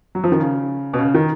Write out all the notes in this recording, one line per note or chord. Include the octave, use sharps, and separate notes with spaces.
F#3
F3
D#3
C#3
B2
C#3
D#3